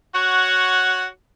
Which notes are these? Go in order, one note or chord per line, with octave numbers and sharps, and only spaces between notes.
F#4 C#5 F#5